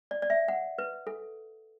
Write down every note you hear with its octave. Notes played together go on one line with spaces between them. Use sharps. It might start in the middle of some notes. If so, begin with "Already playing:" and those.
D5
D5
E5
F#5
B4
A4